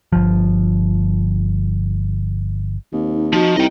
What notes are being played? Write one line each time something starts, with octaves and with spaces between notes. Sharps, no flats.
G1 F3
D#2 C4
D#4
F3 D#4 F#4
C2 E4 D#5 G5